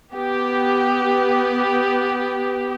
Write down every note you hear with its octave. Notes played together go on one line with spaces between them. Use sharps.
B3 G4